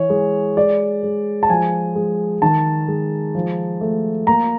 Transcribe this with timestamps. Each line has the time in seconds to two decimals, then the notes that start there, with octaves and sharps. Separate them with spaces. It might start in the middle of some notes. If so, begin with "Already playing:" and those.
Already playing: E3 C#5
0.10 G#3
0.57 G#3 D5
1.03 G#3
1.43 A5
1.49 F3 G#5
1.95 G#3
2.42 D#3 A5
2.88 G#3
3.35 F3
3.81 A3
4.27 A#3 A#5